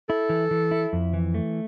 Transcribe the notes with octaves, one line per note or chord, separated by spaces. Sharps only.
E4 A4
E3
E3
E4
F2
E3
A3